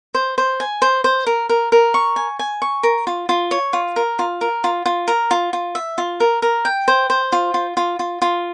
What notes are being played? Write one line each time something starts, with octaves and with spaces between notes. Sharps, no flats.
C5
C5
G#5
C5
C5
A#4
A#4
A#4
C#6
G#5
G#5
C#6
A#4
F4
F4
C#5
F4
A#4
F4
A#4
F4
F4
A#4
F4
F4
E5
F4
A#4
A#4
G5
C5
C5
F4
F4
F4
F4
F4